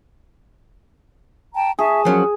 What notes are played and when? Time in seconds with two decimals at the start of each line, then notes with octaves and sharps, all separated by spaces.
1.55 G5 A5 A#5
1.79 G#4 E5 A5 C#6
2.05 F3 F#3 C#4 A#4